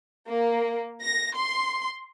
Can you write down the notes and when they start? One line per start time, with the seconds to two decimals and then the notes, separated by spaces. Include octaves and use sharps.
0.27 A#3
1.01 A#6
1.36 C6